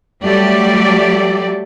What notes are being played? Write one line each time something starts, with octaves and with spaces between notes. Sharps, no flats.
F#3 G3 A3 G4 D5